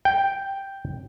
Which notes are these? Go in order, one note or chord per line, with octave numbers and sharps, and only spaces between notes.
G5